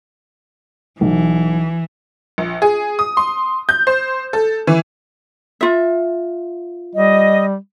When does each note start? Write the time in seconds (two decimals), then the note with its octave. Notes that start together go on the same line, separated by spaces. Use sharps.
1.01 B1 E3
2.38 A#1
2.62 G#4
2.99 D#6
3.17 C6
3.69 G6
3.87 C5
4.33 A4
4.67 E3
5.61 F4 E5
6.95 G3 D#5